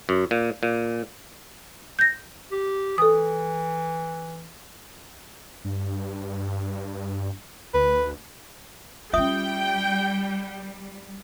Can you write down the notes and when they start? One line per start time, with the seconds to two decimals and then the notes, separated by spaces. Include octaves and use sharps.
0.09 F#2
0.31 A#2
0.63 A#2
1.99 G6 A#6
2.52 G4
2.98 E3 A4 D#6
5.65 G2
7.74 D2 B4
9.13 G3 C#4 F4 E5 G5 D#6